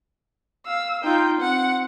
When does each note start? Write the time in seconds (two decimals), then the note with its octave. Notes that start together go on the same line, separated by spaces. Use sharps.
0.66 F5 E6
1.04 D#4 F4 G5
1.40 C4 F#5